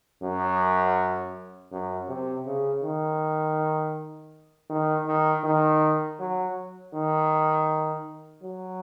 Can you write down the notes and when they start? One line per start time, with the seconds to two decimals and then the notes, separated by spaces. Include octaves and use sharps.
0.22 F#2
1.72 F#2
2.08 C3
2.46 C#3
2.83 D#3
4.70 D#3
5.07 D#3
5.44 D#3
6.20 F#3
6.94 D#3
8.43 F#3